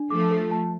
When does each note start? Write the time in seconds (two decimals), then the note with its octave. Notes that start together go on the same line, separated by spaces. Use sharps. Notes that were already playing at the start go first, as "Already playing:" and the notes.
Already playing: D4
0.10 F3 A3 D6
0.31 A4
0.51 A5